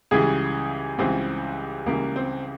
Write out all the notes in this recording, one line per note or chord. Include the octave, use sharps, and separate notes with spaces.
C#2 C#3 E3 G3 G#4
C#2 C#3 E3 G3 C4
C#2 C#3 E3 G3 A#3
C4